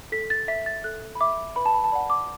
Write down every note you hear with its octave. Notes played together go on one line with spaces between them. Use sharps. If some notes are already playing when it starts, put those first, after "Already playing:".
A4 B6
A6
E5 B6
A6
A4 F#6
B5
E5 D6
B4 B5
A5
B5
A5
D5 F#5 B5
D6